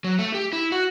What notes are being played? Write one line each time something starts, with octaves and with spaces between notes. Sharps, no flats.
F#3
A3
G4
E4
F#4